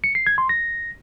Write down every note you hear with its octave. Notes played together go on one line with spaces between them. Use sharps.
C#7
C7
G#6
C6
A#6